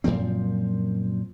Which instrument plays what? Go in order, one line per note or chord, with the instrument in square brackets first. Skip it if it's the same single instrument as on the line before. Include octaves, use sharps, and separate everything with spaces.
[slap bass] F#2 A#2 F3 C4